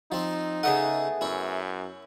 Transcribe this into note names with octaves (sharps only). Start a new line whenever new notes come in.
F3 C4 D#4
C#3 A3 B3 G#4 D#5 F#5
F#2 E4 C#5